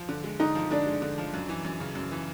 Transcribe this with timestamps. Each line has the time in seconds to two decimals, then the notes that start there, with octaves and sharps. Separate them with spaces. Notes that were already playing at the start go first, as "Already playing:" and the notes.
Already playing: F3
0.09 D3
0.24 G#3
0.40 D3 D#4
0.55 F3
0.71 D3 D4
0.87 G#3
1.02 D3
1.18 F3
1.34 F#2
1.49 E3
1.65 F#2
1.80 C#3
1.95 F#2
2.12 E3